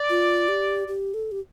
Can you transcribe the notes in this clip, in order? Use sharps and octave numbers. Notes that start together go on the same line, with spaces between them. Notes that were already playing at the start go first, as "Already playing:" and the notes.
Already playing: D5
F4
G4
G4
A4
G4